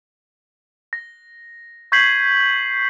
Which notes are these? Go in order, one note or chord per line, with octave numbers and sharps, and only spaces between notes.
A#6
C#6 G6 G#6 B6 C7 F#7